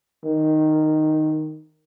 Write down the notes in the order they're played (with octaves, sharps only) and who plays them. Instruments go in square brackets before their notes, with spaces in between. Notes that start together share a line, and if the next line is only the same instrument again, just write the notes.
[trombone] D#3